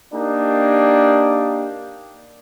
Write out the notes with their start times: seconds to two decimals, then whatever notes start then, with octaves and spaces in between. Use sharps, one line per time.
0.13 A#3 D4 D#4 G4